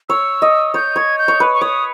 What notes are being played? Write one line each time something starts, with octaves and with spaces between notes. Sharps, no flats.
C#5 E6
D#5
C#5 G6
C#5 G#6
G6
C#5
B4
C#6
C#5 D#6